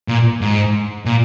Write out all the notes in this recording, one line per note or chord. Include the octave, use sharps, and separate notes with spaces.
A#2
G#2
A#2